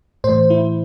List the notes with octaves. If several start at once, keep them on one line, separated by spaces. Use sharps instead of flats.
A2 E3 C5
E4